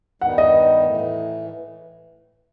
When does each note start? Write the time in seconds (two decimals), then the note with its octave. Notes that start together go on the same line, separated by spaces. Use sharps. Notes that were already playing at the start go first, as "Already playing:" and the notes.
0.21 G2 D#3 G3 B3 D#4 F#5
0.38 D#5
0.85 A2 E3 A3